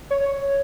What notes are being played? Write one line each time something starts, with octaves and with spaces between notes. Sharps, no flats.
C#5